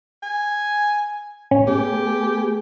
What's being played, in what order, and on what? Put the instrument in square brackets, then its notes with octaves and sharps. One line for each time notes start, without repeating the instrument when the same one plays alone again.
[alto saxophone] G#5
[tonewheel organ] A2 [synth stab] C#4
[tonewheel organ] A3 B3 G#4 [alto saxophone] G4